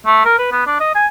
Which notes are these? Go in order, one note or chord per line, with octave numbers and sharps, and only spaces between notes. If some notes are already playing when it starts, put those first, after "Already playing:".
A3
A#4
B4
B3
D4
D#5
G#5